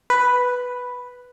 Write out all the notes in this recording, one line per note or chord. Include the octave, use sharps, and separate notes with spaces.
B4